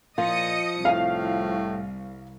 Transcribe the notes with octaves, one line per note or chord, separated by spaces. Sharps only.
A#2 F3 D#5 D#6 C#7
C2 A2 F5